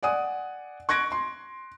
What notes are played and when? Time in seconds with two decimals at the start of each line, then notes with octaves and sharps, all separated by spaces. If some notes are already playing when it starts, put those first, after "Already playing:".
0.03 D5 F#5 G#5 D#6
0.89 C#6 F#6 G#6 A#6 D7
1.12 C6